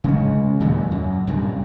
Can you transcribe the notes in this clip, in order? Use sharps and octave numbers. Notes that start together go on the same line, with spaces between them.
C#3 G#3 C#4
D#2 A#2 C#3 F#3
F#2
C2 G2 A#2